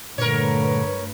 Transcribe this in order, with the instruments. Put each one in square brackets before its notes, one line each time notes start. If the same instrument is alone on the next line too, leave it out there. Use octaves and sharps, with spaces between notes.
[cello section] G2 A3 B4 [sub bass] A#2 [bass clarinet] D3 [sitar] A#4 C#5